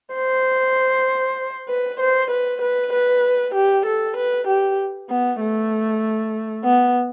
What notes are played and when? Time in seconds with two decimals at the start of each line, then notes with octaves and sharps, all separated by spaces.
0.14 C5
1.69 B4
2.00 C5
2.31 B4
2.61 B4
2.93 B4
3.54 G4
3.86 A4
4.17 B4
4.48 G4
5.09 B3
5.40 A3
6.64 B3